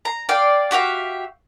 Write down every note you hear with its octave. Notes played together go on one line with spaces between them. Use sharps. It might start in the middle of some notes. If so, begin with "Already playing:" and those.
A#5
D5 F5 G5
F#4 G4 E5 F5